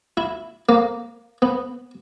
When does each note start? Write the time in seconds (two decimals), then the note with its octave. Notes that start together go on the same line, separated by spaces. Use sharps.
0.17 E4
0.69 A#3
1.42 B3